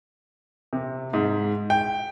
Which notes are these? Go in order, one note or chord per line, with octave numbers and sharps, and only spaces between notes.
C3
G#2
G5